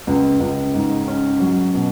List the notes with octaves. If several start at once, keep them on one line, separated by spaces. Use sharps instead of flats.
C#2
C#2
G#2
C#4
F#3
B2